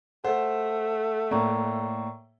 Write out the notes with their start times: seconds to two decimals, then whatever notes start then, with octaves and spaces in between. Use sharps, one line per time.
0.24 A3 C5 F#5
1.31 A2 A#3 D5 A#5 C#6